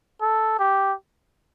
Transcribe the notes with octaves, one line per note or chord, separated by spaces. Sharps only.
A4
G4